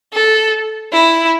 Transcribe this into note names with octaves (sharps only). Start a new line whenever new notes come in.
A4
E4